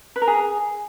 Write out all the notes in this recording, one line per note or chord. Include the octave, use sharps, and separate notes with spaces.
B4
A#4
G#4